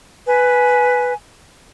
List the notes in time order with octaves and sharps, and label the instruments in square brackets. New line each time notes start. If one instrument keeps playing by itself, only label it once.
[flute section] B4 G#5